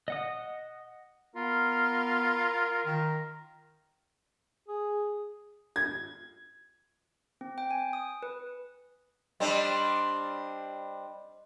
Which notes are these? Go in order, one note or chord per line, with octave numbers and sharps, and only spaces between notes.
D#5 F#5 D#6
B3 F4 A#4
D#3
G#4
G#6
C4
G5
G#5
D#6
B4
G3 C4 D4 D#5